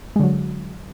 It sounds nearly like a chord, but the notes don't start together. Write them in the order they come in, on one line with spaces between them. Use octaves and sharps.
G#3 D3 F#3